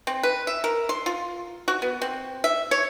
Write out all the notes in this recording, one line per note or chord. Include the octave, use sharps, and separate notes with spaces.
C4
B4
E5
A#4
C6
F4
F#4
B3
C4
E5
C#5